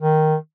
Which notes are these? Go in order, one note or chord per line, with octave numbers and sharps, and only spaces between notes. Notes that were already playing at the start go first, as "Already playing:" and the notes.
D#3